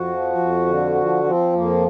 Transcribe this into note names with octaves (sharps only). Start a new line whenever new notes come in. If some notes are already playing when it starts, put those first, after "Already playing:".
Already playing: F2 F#4
F3
F2
D3
F3
F3 C4
F2 A#3